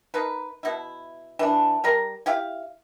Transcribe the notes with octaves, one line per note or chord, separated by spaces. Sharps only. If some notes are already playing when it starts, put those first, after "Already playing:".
D#4 A#4 B4
B2 E4
E3 D4
G3 A#4 A#5
E4 G4 F5